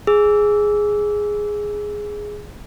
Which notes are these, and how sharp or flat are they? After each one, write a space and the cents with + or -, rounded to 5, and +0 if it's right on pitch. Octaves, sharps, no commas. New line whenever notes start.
G#4 +0 E6 +0